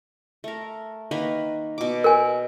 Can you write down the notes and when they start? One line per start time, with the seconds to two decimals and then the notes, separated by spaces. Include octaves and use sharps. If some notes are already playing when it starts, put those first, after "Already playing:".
0.44 A3 A#4
1.11 D#3 A#3 B4
1.78 B2 D6
2.04 A#4 G#5